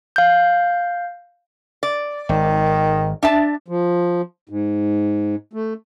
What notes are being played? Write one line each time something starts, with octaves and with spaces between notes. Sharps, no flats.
F5 G6
D5
G#1 D#3
D4 E5 A5
F3
G#2
A3